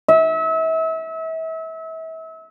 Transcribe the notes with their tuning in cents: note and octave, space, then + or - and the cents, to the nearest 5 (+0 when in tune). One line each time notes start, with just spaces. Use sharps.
E5 -35